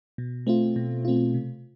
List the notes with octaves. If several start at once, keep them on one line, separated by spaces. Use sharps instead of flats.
B2
A3 C4 F4
B2
A3 C4 F4
C3